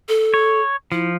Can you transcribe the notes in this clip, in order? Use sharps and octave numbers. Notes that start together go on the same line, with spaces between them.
A4
C#5
F3 E4